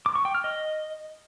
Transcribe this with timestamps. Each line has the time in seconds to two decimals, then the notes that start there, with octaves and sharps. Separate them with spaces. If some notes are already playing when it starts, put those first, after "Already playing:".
0.06 D6
0.15 C#6
0.25 G5
0.35 F6
0.44 D#5